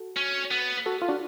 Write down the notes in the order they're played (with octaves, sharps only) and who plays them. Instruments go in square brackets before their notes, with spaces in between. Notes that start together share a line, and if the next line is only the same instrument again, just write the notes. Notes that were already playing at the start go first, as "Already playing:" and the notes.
Already playing: [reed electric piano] F#4 A4
[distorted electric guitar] C#4
B3
[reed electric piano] F#4 A4
F4
D4 F#4